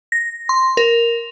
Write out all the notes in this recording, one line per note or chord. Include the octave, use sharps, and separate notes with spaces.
A#6
C6
A#4